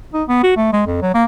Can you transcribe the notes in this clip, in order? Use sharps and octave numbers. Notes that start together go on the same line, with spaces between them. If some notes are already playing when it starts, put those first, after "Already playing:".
D#4
B3
F#4
A3
G#3
F2
F#3
A#3